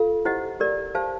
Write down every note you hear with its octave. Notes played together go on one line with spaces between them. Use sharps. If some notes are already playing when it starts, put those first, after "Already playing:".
Already playing: F4 A4 F5
E4 G4 C5 D#5 F#5
G4 A#4 D5
G4 C5 F5 A5